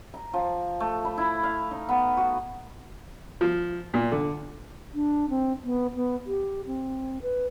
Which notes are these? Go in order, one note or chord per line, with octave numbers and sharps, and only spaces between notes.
A#5
F3
A3
B5
E4
F5
D#4
B3
F#4
F3
A#2
D3
D4
C4
B3
B3
G4
C4
B4